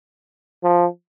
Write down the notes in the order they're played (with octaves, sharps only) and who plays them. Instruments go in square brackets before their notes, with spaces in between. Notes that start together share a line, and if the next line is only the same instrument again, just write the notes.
[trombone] F3